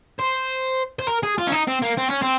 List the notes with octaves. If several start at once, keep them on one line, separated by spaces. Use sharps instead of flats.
C5
C5
A#4
G#4
F4
C#4
D#4
C4
A#3
C4
C#4
C4